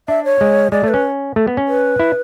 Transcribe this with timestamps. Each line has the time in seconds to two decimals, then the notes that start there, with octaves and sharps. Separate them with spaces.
0.08 D4 E5
0.25 C#5
0.41 G#3
0.72 G#3 D5
0.84 A3
0.88 B4
0.94 C#4
1.36 A3
1.47 B3
1.57 C#4
1.68 B4
1.99 E4